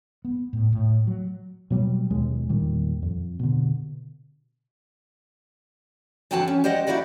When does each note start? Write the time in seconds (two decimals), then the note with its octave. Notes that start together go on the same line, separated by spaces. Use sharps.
0.25 B3
0.53 A2
0.73 A2
1.07 F#3
1.70 B2 F#3 G3
2.10 D#2 B2 G#3
2.49 E2 A#2 D#3 G3
3.02 F2
3.39 B2 D3
6.31 D3 E3 C4 F#4 B4 A5
6.48 C#4
6.64 G4 C5 D5 D#5 F#5
6.87 A3 A#3 E4 F#4 D5 F#5